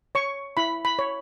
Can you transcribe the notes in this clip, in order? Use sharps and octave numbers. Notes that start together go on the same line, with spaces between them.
C#5 C#6
E4 B5
B5
C#5